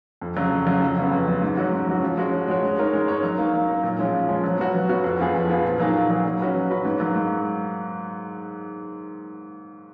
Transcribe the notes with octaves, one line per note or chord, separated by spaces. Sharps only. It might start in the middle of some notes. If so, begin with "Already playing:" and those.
F2
C#3 F#3
F2
C#3 F#3
F2
C#3 F#3 B3
F2
C#3 F#3 B3
G#2
F#3 C#4 F#4
G#2
F#3 C#4 F#4
F3
G#3 C#4 F#4 C#5
F3
G#3 C#4 F#4 C#5
G#3
D#4 A#4 C#5
G#3
D#4 A#4 C#5
F#3
A#3 D#4
F#3
A#3 D#4
A#2
F3 G#3 C#4 F4
A#2
F3 G#3 C#4 F4
F#3
B3 F#4 C#5
F#3
B3 F#4 C#5
F2
F3 B3 F4 G#4
F2
F3 B3 F4 G#4
A#2
F#3 A#3 D#4 G#4
A#2
F#3 A#3 D#4 G#4
F#3
C#4 F#4 B4
F#3
C#4 F#4 B4
G#2
F#3 A#3
G#2